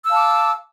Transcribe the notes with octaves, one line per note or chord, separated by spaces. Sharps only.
F5 A5 D6 E6